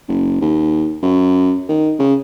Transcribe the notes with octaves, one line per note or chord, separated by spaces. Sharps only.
F#1
D#2
F#2
D#3
C#3